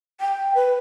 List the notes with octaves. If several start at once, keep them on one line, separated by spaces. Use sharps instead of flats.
G5
B4